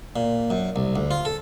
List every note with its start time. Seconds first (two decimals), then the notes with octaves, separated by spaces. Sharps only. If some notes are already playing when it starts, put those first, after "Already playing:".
0.16 A#2
0.50 F#2
0.76 C2
0.96 D2
1.11 F4
1.25 A4